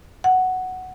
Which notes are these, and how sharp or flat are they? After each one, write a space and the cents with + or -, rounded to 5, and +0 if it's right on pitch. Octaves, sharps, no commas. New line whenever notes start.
F#5 +5